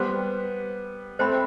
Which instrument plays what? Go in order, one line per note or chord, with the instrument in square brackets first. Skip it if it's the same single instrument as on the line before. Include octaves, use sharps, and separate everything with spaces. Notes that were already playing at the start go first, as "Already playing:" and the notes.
Already playing: [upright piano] G3 B3 [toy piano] C5 G5 C6
[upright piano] A3 C4 [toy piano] C5 G5 B5